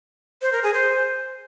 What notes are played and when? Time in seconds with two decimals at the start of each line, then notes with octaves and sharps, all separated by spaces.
0.42 C5
0.52 A#4
0.63 G#4
0.74 C5